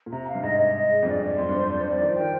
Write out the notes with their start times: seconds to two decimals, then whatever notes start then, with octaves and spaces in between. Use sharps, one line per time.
0.06 A#2
0.12 C3 A#5
0.28 F5
0.35 G2
0.43 G#2 D#5
0.59 D#5
0.75 D#5
0.90 G#4
1.02 F2
1.06 G2 D5
1.23 D5
1.38 F2 C6
1.49 G2
1.54 C5
1.59 G2
1.69 F2 D5
1.80 G2
1.85 D5
1.90 F2
2.01 D#3 C5
2.10 F3
2.17 D#3 G5